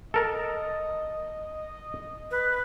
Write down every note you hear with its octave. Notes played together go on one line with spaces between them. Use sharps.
A4 A#4 D#5 A5
B4